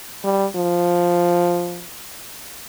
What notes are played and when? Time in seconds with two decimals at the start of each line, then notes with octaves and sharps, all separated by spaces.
0.24 G3
0.56 F3